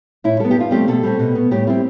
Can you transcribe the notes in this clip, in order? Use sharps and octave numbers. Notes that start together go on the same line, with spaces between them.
A2 E4
G3 B3 A4
G4
G2 F4
F3 G3 A3 C4 G4
B2 A3 A4
G3 C4
B2
B3
A2 G3 G4
G3 C4 E4